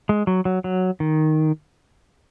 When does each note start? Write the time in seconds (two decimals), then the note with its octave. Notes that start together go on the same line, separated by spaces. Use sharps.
0.09 G#3
0.27 F#3
0.45 F#3
0.64 F#3
1.00 D#3